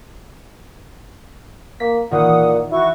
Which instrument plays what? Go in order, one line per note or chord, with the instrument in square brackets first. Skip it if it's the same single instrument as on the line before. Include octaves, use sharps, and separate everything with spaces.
[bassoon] A#3 [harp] B6
[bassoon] A#2 [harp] D#3 E3 [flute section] F#5 D#6
[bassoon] E4 [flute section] F#4 C#6